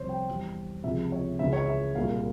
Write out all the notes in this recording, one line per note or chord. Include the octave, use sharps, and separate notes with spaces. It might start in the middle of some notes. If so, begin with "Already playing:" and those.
Already playing: C2 C3 F3 C5 C#5
G5
E2 E3 G3
C#2 C3 F3 G#3 E5
C#5
C#2 C#3 E3 G#3 E5
C#5
E5
C2 A#2 G#3 F5